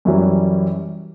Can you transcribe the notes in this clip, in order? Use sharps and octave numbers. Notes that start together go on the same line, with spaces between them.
F#2 E3 G3 C#4